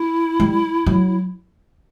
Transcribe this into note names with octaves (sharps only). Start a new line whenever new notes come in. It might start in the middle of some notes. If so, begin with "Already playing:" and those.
Already playing: E4
G3
F#3